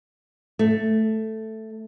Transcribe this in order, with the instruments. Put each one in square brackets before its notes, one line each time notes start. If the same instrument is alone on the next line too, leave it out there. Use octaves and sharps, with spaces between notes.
[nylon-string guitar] A3